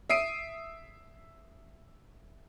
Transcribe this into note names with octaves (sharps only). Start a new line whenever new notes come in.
E5 D#6 C7 D7 D#7